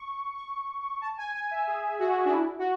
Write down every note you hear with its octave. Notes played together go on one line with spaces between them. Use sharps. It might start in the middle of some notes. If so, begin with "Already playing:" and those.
Already playing: C#6
C#6
A5
G#5
G#5
E5
G#4
F#4
D4
E4
F#4